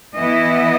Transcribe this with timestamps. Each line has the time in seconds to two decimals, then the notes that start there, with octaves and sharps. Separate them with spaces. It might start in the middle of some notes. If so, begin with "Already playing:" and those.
0.15 E3 B3 E4 D#5